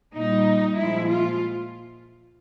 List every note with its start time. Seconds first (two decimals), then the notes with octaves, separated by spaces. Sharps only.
0.14 A#2 G3 D#4
0.77 A#2 F3 G#3 E4
1.09 F4